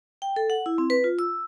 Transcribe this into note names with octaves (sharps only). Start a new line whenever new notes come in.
G5
A4
F#5
E4
C4
B4
F4
E6